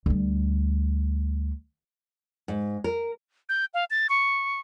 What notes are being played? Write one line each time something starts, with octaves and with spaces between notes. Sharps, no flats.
D2 G3
G#2
A#4
G6
F5
A6
C#6